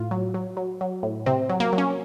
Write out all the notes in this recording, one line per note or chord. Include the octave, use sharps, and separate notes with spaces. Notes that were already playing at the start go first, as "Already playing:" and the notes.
Already playing: A2 F4
F#3
F#3
F#3
F#3
A2
C3 C4
F#3
A#3
F#3
C#4